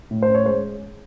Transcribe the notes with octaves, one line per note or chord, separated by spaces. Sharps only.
A2
C5
C#4
C#5
G#3 C5